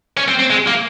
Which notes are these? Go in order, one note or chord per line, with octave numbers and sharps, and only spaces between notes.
C#4
C4
C4
G#3
A#3